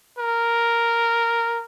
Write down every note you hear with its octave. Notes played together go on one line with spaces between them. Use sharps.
A#4